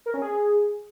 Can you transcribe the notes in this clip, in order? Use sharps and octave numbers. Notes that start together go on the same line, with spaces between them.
A#4
C#4
G#4